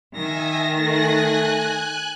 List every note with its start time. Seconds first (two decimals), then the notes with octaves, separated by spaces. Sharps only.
0.13 D#3 E5 G#5 A#6
0.77 A3 G#5 F#6